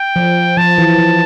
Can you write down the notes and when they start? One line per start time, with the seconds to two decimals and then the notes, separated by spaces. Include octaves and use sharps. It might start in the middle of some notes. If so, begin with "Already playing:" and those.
Already playing: G5
0.16 F3
0.57 F3 A5
0.78 E3
0.98 F3